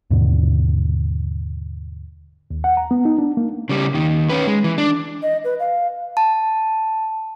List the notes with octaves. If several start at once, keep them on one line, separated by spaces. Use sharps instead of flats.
D#2 G#2 B2 D3
D#2
F#5
A#5
B3
D#4
D4
A#3
C#3 G3
D#2 D#3
C#4 B4
G#3
E3
D4
D#5
B4
F5
A5